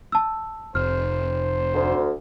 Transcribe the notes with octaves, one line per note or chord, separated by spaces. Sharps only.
A5 E6
F1 C5 F6
D2